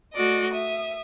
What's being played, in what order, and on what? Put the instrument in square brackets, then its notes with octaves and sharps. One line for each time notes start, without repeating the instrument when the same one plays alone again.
[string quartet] A3 F#4 D5 D#5
E5 D#6